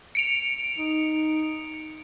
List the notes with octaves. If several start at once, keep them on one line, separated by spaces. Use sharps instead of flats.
C#7 D7 F7
D#4